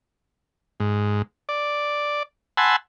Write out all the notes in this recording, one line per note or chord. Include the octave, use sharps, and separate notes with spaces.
G#2
D5
F#5 G#5 A5 B5 C6 E6